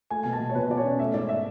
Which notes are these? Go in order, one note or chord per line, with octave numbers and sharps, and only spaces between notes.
A3 G#5
B2 G#5
A5
B2
C#5
B2 B4
B2 D5
C#5
C#4
A3 E5
G#2 D5
E5